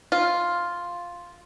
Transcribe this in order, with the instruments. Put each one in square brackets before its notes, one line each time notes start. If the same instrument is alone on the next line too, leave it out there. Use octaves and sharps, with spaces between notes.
[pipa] F4